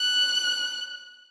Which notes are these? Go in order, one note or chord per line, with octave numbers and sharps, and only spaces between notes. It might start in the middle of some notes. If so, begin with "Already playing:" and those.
Already playing: F#6